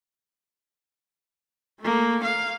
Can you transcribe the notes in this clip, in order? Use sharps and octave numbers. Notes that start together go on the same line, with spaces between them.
A3 A#3
F5